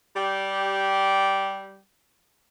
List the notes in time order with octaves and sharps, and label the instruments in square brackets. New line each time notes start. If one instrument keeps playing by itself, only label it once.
[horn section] G3 G4